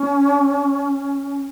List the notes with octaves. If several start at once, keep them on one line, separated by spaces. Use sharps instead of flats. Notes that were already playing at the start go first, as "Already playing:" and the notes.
Already playing: C#4